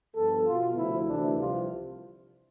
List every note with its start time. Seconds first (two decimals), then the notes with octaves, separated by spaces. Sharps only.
0.14 G2 F3 B3 A4
0.45 B2 B3 F4
0.76 D2 C3 F3 E4
1.07 D2 C3 E3 D4
1.38 C2 C3 F3 F4